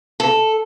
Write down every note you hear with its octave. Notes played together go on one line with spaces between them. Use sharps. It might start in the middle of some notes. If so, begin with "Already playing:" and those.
A4